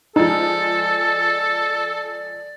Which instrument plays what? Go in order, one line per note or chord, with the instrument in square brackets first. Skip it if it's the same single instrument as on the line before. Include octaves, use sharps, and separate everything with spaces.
[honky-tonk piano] F3 G#3 [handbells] D#4 [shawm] A4 [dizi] D5